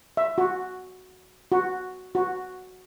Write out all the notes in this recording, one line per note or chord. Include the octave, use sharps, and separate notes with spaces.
E5
F#4
F#4
F#4